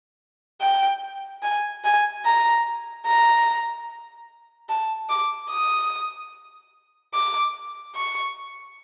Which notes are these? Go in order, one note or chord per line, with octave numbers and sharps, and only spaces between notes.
G5
G#5
G#5
A#5
A#5
A5
D6
D#6
D6
C#6